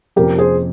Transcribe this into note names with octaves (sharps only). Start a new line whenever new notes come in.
F2 C3 F3 A#3 C#4 G4 A#4
G#4 C5